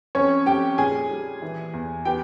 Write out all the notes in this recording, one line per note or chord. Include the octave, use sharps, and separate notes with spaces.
F2 C#4 C#5
F2 G4 G5
A#2 G#4 G#5
G3
E3
E2
B3 G4 G5